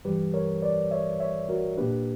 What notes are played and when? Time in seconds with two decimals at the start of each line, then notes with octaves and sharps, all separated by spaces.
0.05 G2 E3 G3 G4 B4
0.34 A#4 C#5
0.62 B4 D5
0.91 C#5 E5
1.20 C#5 E5
1.49 F#4 A#4
1.77 A#2 A#3 D4 G4 B4